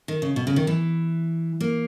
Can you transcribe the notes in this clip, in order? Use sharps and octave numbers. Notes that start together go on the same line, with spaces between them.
D#3
C#3
B2
C#3
D#3
E3
A#3